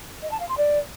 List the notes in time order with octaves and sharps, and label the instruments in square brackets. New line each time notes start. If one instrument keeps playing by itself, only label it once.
[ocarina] D#5
A5
F5
C6
D5